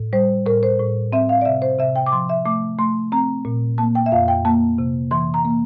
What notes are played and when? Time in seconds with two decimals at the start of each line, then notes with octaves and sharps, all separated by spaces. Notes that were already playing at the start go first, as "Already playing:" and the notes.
Already playing: A2
0.13 G3 C5
0.46 A2 A#4
0.63 C5
0.80 A2
1.13 C4 E5
1.29 F5
1.41 D5
1.45 C3 E5
1.62 C5
1.79 C3 E5
1.96 G5
2.06 D6
2.12 F3 C6
2.29 E5
2.46 A3 D6
2.78 A3 C6
3.12 C4 A#5
3.45 A#2
3.78 A#3 A5
3.95 G5
4.06 E5
4.12 F2 F5
4.28 G5
4.45 A#3 A5
4.78 C3
5.11 E3 C6
5.34 A#5
5.45 A#3